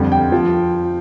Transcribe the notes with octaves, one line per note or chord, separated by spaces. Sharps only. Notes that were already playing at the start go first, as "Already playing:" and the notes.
Already playing: F2 D3 G3
G5
F3